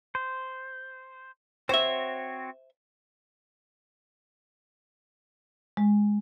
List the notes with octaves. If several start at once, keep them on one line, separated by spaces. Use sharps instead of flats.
C5
C4 F#4 C5 C#5 E5
G#3